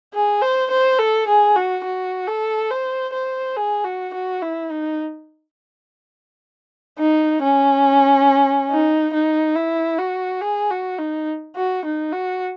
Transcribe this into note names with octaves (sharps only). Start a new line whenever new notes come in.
G#4
C5
C5
A4
G#4
F#4
F#4
A4
C5
C5
G#4
F#4
F#4
E4
D#4
D#4
C#4
D#4
D#4
E4
F#4
G#4
F#4
D#4
F#4
D#4
F#4